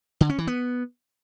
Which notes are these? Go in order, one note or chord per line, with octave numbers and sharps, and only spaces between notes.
D3
C#4
E3
B3